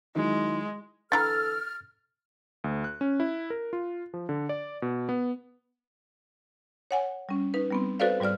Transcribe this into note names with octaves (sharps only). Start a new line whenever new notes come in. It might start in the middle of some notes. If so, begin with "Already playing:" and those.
D#3 F#3 G#3 E4
D3 E3 A4 A#5 F6 A6
D2
F#6
C#4
E4
A#4
F4
F3
D3
D5
B2
B3
C#5 F#5 G#5
G3 C#4
D#4 B4
G3 B3 C4
F#4 A4 B4 C5 D5 F5
G#2 G3 F#4 D5 F6